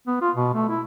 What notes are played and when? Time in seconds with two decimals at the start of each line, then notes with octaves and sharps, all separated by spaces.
0.07 B3
0.22 F4
0.35 B2
0.54 A3
0.69 E4